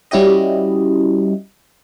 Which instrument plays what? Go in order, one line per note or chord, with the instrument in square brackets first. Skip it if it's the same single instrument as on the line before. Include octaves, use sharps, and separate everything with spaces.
[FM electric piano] G3 C#4 E4 F#4 G4 D#5